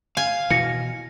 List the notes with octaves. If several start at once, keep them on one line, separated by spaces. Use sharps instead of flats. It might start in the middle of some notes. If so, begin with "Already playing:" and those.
F5 G#5
B2 E3 A#6 C#7